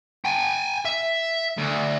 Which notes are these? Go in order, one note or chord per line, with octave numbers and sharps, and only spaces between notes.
G5 G#5
E5
D2